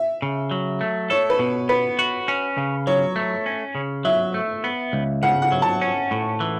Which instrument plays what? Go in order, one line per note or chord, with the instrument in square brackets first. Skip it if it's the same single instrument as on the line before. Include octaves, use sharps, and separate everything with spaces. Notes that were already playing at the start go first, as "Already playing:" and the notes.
Already playing: [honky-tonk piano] E5
[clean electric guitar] C#3
F#3
A3
[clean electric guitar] A4 [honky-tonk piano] C#5
[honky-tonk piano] B4
[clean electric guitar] B2
[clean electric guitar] B3 [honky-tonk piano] B4
[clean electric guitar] F#4
C#4
C#3
[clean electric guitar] F#3 [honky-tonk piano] C#5
[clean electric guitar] A3
C#4
C#3
[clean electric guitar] F#3 [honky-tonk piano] E5
[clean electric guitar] A3
B3
C#2
[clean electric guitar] C#3 [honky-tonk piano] F#5
[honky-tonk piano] F#5
[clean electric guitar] F#3
[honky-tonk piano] A5
[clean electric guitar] C#4
A2
E3